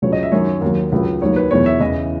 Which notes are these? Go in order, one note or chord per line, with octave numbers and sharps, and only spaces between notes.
C#2 C#3 F#3 C#5
D#5
E5
F#2 D#3 F#3 C#5
D#2 D#3 F#3
C#2 C#3 F#3
D#2 D#3 F#3 C#5
B4
E2 B2 F#3 C#5
E5
E2 C#3 E3 D#5